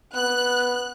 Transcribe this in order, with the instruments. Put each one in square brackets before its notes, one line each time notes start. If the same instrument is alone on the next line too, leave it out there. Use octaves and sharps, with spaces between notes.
[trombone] B3 [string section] F#6